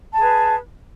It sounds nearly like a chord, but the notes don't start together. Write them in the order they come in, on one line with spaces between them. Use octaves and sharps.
A5 G#4 B4